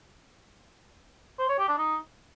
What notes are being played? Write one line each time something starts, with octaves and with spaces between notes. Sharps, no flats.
C5
C#5
G4
D4
D#4